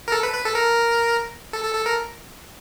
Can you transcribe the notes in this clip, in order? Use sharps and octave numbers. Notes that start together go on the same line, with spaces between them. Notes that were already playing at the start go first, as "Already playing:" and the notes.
A#4
A4
B4
B4
A4
A#4
A4
A4
A4
A#4